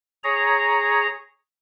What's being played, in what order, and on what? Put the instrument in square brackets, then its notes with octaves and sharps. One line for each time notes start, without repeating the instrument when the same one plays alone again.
[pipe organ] G#4 C#5 A#5